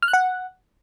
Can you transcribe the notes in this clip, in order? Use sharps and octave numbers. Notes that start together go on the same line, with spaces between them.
F6
F#6
F#5